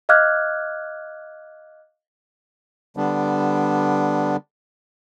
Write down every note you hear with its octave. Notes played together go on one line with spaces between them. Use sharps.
D#5 F5 D6 F6 F#6 G#6
D3 G3 B3 D4